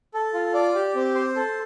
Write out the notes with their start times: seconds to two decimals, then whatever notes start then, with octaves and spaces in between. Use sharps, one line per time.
0.14 A4
0.34 F4
0.54 D5
0.75 G4
0.95 C4
1.15 C5
1.36 A4